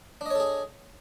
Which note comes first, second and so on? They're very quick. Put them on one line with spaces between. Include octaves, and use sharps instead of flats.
D4 D#5 C#5 A4 G#4